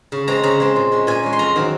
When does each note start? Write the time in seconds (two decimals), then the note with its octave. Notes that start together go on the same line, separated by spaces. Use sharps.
0.12 C#3
0.28 G#3 C4 A#5
0.43 C#3 A#5
0.60 G#3 C4
0.76 A#2
0.92 G#3 C#4
1.07 A#2 G#5
1.23 G#3 C#4
1.33 C6
1.39 F2 A#5
1.56 D#3 F#3 C4